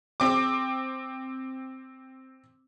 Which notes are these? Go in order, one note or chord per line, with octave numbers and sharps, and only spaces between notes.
C4 D6